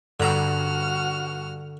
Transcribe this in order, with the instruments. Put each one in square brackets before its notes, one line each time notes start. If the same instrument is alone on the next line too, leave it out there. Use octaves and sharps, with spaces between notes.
[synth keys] G2 [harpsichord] D3 A#5 [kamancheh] F#4 F6